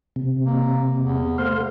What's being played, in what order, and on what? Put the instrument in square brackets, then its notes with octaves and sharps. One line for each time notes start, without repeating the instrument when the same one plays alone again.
[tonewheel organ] C3
[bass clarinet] A#3
E2
[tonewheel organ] A3 F5 [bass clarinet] C5